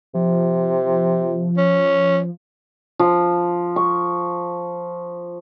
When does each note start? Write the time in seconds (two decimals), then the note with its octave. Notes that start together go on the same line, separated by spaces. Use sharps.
0.14 C3 F3
1.57 C#4
2.99 F3
3.76 C#6